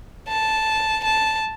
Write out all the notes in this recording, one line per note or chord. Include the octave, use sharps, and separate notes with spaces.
A5
A5